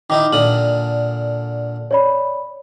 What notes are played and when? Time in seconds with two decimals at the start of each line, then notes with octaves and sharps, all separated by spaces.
0.10 D#3 D#4 E4 D6
0.33 A#2 D3 D#6 F#7
1.91 C#5 D5 B5